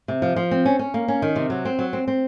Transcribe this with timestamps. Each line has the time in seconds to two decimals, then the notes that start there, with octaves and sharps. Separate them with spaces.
0.08 C3
0.22 F3
0.36 F3
0.51 C4
0.65 C#4
0.79 C#4
0.94 A#3
1.08 C#4
1.22 D#3
1.36 C3
1.50 F#3
1.65 C4
1.79 F#3
1.93 C4
2.08 C4